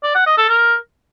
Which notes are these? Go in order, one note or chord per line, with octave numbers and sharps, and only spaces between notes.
D5
F#5
D#5
A4
A#4